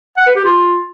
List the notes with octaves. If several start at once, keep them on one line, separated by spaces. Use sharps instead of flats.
F#5
B4
G4
F4